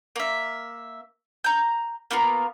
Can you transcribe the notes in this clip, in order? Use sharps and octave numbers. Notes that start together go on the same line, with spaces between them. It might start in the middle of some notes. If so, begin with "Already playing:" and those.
A#3 E5
A#5 G6
A#3 B3 F4 A#4